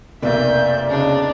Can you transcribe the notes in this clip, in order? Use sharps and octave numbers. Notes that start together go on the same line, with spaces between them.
F1 B1 A#3 D5 E5 G6
C#3 D4 D#4